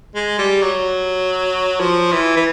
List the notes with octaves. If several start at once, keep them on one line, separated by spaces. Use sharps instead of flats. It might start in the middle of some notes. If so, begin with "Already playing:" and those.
G#3
G3
F#3
F3
E3
E3